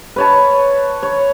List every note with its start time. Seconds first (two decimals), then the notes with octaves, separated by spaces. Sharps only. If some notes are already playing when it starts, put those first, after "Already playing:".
0.16 B4 C#5 A5
1.03 C#5